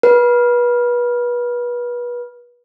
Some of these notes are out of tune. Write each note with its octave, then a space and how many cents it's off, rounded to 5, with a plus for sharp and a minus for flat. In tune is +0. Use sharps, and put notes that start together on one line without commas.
B4 -30